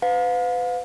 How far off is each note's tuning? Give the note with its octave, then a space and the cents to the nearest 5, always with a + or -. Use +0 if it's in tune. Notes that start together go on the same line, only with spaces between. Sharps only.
B4 +35 F5 +35